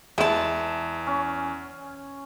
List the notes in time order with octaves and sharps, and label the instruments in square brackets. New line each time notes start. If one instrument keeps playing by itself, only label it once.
[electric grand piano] E2 E7 [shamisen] G#3 E4 [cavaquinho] E5 A5
[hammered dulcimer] C#4